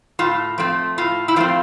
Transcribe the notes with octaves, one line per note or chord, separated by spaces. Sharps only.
A2 F4
F3 A3 C4
A2 F4
E4
F3 A3 C4 F4